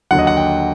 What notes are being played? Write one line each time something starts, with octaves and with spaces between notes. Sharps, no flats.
D#2 D3 F#3 F#5
D#5
F#5
G5